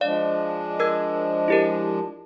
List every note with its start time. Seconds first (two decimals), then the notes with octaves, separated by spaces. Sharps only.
0.01 F3 G#3 D4 D5 F5
0.80 A#4 E6 G#6
1.48 E4 G4 A#4